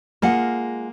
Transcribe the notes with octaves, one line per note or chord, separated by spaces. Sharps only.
G#3 A#3 F4 F#5